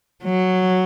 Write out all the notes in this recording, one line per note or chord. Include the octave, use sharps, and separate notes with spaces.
F#3